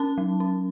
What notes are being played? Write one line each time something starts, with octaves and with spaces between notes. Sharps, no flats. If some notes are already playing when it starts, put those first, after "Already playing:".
Already playing: C#4 A5
F#3
C#4